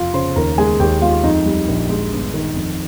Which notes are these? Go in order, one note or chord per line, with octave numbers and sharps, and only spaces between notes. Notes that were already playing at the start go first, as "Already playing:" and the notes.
Already playing: F1 F4 F5
C#3 C5 C6
D#2 A#4 A#5
G#3 G#4 G#5
D#2 G4 G5
G#3 F4 F5
F2 D#4 D#5
G3
A#1
G#3
G1
D#3
F2